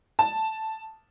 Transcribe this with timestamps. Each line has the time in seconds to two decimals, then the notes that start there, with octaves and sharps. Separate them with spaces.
0.19 A5